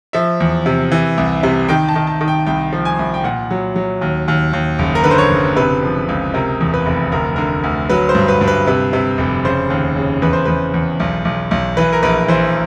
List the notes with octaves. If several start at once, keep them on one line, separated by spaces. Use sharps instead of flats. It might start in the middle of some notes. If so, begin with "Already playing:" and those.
F3 E5
E2
C3
E3
C2
C3
D#3 G5
A5
D#3
A5
D#3
G5
C2 G5
F3
G#5
C2
G5
A#2 F#5
F#3
F#3
D#2
D#2
D#2
F#1
A#4
D3 B4
C5
C#5
F#1
C3 B4
F3
C#2
C3 A#4
E2
B4
F1
D2 A#4
D3 A#4
D2
F#3 B4
C5
G2
B4
G2
B4
C3 B4
C3
F1
C#3 C5
D#2
C#3
E2 B4
C5
E2 B4
E2
B1
B1
B1
E3 B4
A#4
A#1 B4
E3 C5